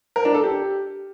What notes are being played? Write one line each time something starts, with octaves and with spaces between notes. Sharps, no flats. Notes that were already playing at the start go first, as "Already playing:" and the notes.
A#4
D4
A4
G4